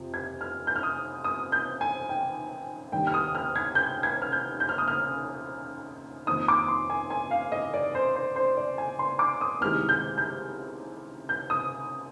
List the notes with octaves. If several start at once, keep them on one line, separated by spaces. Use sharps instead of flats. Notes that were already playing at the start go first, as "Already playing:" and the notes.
Already playing: F2 C3 F3 C4
G#6
F6
G6
F6
D#6
D#6
G6
G#5
G5
D#2 D#3 G3 D4 G5
F6
D#6
F6
G#6
G6
G#6
F6
G6
G6
F6
D#6
F6
F2 D#3 A#3 D#4 D#6
D6
C6
G#5
G#5
F5
D#5
D5
C5
C5
C5
D5
G#5
C6
D6
D#6
C2 C3 D#3 G#3 F6
G6
G6
G6
D#6